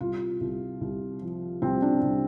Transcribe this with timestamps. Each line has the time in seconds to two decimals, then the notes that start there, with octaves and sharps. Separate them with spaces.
0.01 C2 F4
0.41 C2
0.81 C2
1.22 F3
1.62 C2 C4
1.82 D4
2.02 C2